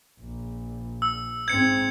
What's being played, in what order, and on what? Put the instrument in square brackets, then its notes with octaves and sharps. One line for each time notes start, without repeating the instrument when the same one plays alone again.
[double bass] A#1
[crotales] E6
[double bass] G#2 C4 [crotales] G#6 C#7